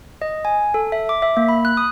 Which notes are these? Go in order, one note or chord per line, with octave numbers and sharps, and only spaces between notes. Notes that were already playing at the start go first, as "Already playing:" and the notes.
D#5
G#5
A4
E5
D6
E5
A#3
B5
F#6
D#6